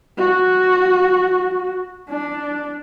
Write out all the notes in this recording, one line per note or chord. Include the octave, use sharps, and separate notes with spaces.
F#4
D4